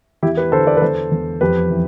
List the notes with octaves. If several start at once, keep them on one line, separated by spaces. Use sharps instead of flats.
E2 E4 G4
G4 B4
D3 A4 C5
B4 D5
B4
E2 A4 C5
E2
F2 G4 B4
E3